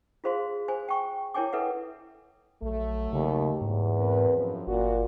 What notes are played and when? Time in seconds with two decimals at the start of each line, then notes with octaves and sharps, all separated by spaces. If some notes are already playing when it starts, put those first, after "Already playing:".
0.24 F4 G#4 C5 F5 C6
0.68 C5 G#5
0.89 G5 C#6
1.34 E4 A#4 C#5 G5 G#5 D6
1.53 A4 B4 E5 F#5
2.62 A#1 F#3 A3
3.13 D#2 C#3
3.61 E2 G#2
3.96 C4 A#4 B4
4.36 F#2 F3
4.67 G1 A#2 F#4